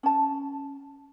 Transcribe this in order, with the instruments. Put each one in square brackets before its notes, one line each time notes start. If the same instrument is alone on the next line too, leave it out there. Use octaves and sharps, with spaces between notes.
[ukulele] C#4 A5